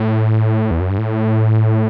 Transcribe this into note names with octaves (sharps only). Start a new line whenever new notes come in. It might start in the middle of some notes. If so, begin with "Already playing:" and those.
Already playing: A2
E2
F#2
G2
A2